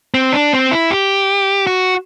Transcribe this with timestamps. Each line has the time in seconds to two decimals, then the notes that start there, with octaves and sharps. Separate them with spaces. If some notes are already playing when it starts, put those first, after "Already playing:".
0.14 C4
0.33 D4
0.53 C4
0.71 E4
0.91 G4
1.67 F#4